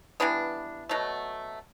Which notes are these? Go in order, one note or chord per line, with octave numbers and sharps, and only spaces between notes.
E3 G3 B3 D4
B2 F#3 A3